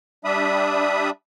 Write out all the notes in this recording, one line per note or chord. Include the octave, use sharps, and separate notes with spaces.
G3 D4 E5 B5 D#6